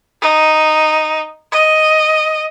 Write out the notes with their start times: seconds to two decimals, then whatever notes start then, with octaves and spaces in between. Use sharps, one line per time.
0.22 D#4
1.52 D#5